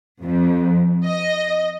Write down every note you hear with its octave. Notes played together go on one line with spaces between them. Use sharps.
F2
D#5